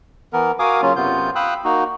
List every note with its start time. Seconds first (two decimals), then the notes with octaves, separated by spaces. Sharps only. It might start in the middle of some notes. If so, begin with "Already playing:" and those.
0.33 E3 B3 A#4
0.59 F#4 A#4 F5 G#5 D6 D#6
0.82 C#3 F#3 A#3 C#4 F4
0.96 F#2 C3 B3 F4 G6
1.35 F5 G5 B5 D#6 E6 F#6
1.64 A#3 D#4 F#4